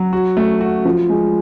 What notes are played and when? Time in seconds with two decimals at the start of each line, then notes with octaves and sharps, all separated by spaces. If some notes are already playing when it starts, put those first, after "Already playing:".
Already playing: F#3
0.13 F#4
0.37 A3
0.61 F#4
0.85 F3
1.10 G#3